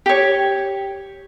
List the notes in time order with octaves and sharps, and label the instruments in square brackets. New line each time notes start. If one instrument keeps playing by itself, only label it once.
[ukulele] G4 C#5